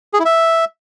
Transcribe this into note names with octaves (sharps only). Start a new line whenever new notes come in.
G#4
E4
E5